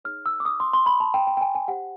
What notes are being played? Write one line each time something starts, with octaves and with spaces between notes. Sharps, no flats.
D#4 G#4 C#5 F6
E6
D6
D#6
C6
C6
B5
A5
G5
G5
G5
G#5
G#5
G4 C5 F#5